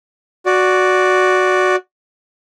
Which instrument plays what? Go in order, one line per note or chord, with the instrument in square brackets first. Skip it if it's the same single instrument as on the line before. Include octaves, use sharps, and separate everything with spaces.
[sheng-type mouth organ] F#4 D5